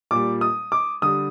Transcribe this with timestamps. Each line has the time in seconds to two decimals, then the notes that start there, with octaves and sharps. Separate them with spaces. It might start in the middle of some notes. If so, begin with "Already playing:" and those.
0.11 A#2 G3 D6
0.41 D#6
0.72 D6
1.02 D3 G3 D#6